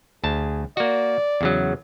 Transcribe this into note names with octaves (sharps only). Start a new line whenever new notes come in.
D2 G#4 A5
A#3 F#4 D5
E2 C#3 F#3